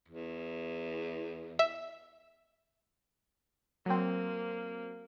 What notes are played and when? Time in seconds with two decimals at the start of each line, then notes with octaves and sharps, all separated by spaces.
0.08 E2
1.59 E5
3.86 F#3 A#3 C4